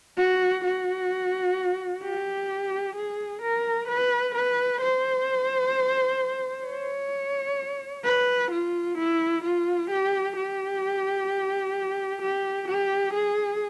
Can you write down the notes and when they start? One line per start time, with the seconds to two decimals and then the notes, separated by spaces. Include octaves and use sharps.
0.18 F#4
0.64 F#4
2.03 G4
2.95 G#4
3.42 A#4
3.88 B4
4.35 B4
4.81 C5
6.66 C#5
8.04 B4
8.51 F4
8.98 E4
9.43 F4
9.90 G4
10.36 G4
12.22 G4
12.68 G4
13.13 G#4